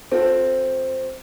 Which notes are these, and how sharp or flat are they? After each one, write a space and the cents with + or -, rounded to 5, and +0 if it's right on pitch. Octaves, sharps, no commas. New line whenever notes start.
C4 +0 F4 +45 A4 +0